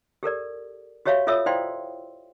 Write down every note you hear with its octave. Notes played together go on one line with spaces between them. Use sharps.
G4 A4 A#4 D5
F#4 G4 C#5 E5 F5 C#6
F4 A4 C#5 E5 D#6 E6
E4 C5 D5 F5 G5 C6